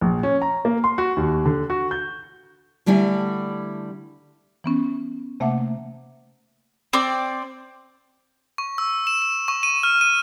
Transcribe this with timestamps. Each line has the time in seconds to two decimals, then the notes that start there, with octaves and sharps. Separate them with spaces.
0.01 A#1
0.23 C#4
0.42 A#5
0.65 A#3
0.84 C6
0.98 F#4
1.17 D#2
1.45 D3
1.70 F#4
1.91 G6
2.86 D3 G3 A3 E4 G#5
4.64 E3 B3 C#4
5.40 C3 A3 A#3 E5 F#5 D6
6.93 C4 D5
8.58 C#6
8.78 E6
9.07 E7
9.22 E7
9.48 C#6
9.63 D#7
9.83 F6
10.01 D#7